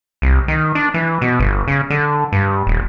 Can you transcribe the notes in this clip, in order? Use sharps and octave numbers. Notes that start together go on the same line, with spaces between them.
C2
D#3
D4
E3
B2
G1
C#3
D3
G2
D#1